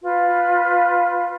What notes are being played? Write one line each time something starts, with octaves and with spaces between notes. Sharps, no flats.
F4 B4